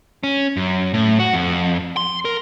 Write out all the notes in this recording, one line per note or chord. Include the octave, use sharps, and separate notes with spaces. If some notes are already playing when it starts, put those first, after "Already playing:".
C#4
F#2
A2
F#4
F2
C6
A#4